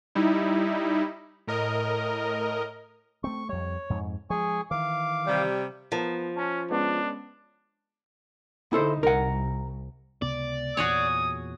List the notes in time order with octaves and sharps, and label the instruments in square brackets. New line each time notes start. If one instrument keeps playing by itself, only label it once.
[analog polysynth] G3 D#4 E4
A2 A#4 D#5
[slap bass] A3 C4 [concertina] C#6
[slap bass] F2 G3 [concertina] C#5
[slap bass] F2 G#2
[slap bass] F3 G#3 [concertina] G#4 G#5 C#6
[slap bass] D#3 E3 [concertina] F5 D6
[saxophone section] C3 G3
[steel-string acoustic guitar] F3 [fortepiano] B3 A#4 A5
[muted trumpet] C#4 [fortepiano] A5
[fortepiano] G#3 B3 C#4 [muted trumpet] D4
[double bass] D3 D#4 [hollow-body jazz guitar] E4 A4 C5
[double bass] C2 [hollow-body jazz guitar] A#4 F#5
[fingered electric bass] C#2 C3 B3 [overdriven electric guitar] D5
[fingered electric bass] E2 A#2 [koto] F#4 G#4 C#5 [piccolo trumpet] D#6